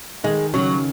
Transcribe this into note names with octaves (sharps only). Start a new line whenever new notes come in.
D#3 G#3
C#3 F#3